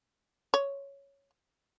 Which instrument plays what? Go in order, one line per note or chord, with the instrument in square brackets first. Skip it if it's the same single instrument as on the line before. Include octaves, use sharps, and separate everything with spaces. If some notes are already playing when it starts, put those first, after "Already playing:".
[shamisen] C#5